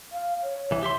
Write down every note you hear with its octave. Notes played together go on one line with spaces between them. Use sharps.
F5
C#5
C2 E3
G4 E5 C6